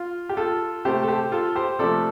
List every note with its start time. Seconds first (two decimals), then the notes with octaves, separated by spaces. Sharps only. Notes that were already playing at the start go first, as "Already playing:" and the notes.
Already playing: F4
0.29 G4
0.37 F4 A4
0.85 C3 A3 G4 C5
1.03 A4
1.08 G4 C5
1.32 F4 A4
1.55 G4 C5
1.79 C3 F3 A3 A4 D5